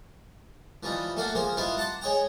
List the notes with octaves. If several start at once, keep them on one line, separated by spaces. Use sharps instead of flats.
E3 F3 G3 D#4
A3 A#3 F#4 D5 F5 G5
F3 G#4 A#4 C5
E4 F4 G4 B4 D#5 F5
F#5 A5 A#5 C6 D6
G#4 C#5 D#5 G5 A#5